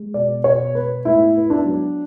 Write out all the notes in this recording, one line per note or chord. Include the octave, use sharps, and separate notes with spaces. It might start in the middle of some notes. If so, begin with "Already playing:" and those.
Already playing: G#3
B2 D5
B2 C#5
B3 B4
A2 E4
B3
D4
F#3